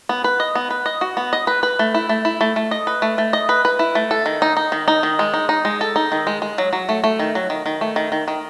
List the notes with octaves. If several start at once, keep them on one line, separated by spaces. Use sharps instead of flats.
B3
B4
D#5
B3
B4
D#5
F#4
B3
D#5
B4
B4
A3
E4
A3
E4
A3
A3
D#5
B4
A3
A3
D#5
B4
B4
E4
A3
A4
D#3
D#4
D#4
D#3
D#4
D#3
G#3
D#4
D#4
G#3
A4
D#4
D#3
G#3
G#3
F#3
F#3
A3
A3
D#3
F#3
D#3
D#3
A3
D#3
D#3
D#3